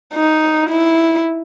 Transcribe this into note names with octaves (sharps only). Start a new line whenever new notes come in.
D#4
E4